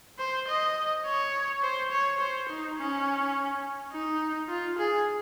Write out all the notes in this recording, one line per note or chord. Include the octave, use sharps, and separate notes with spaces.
C5
D#5
C#5
C5
C#5
C5
D#4
C#4
D#4
F4
G#4